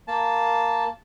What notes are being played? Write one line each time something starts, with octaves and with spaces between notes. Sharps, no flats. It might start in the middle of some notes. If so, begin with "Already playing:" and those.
A#3 A5